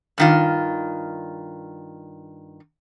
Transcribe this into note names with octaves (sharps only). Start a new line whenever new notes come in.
G2 D#3 F4